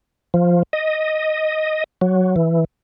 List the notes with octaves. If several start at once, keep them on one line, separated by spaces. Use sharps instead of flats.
F3
D#5
F#3
E3